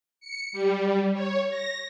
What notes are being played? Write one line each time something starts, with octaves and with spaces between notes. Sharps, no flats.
C#7
G3
C#5
A#6